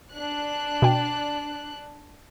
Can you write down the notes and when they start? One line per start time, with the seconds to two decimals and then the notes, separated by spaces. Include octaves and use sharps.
0.11 D4 F#6
0.82 B2 G5